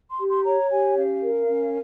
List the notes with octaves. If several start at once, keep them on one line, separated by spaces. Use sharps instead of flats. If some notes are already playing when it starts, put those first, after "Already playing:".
C6
G4
C6
C#5 A#5
G4 G#5
C#4 F5
A#4
C#4